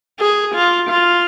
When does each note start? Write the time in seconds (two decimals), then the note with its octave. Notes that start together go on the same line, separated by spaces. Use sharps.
0.19 G#4
0.55 F4
0.90 F4